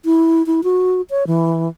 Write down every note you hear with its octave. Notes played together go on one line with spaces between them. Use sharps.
E4
E4
F#4
C#5
E3